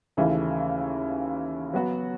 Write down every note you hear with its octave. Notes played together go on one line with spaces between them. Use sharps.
D#2 C#3 E3 A3
F#3 B3 F#4